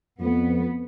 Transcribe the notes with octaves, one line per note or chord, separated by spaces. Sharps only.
F2 B3